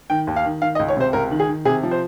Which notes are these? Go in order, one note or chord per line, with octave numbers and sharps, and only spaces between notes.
D#3 G5
D#2
F5
D#3
D#3 F5
D#5
C#2
C#5
C3 C5
C#2 A#4
D#3
G#4
D#3
C3 G#4
F3
C5